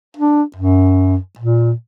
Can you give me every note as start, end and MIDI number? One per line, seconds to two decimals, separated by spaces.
0.17 0.42 62
0.56 1.17 42
1.39 1.72 46